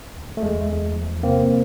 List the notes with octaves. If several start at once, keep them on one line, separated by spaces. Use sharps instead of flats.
D2
A3
E2 G#3
E2
F3
C3 A#3 C4